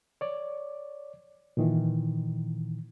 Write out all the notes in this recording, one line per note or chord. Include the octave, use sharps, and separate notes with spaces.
C#5 D5
A#2 D#3 E3